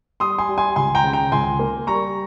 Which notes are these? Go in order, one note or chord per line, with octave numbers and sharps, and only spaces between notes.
G3 C6 D#6
G#5 C6
G3
G#5 C6
C#2 G#5 C6
G5 A#5
C#3
G5 A#5
C#2 G#5 C6
A#3
G3 A#5 C#6